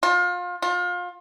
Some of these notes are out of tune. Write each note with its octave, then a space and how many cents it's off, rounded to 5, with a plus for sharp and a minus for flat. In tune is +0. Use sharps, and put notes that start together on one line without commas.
F4 +30
F4 +30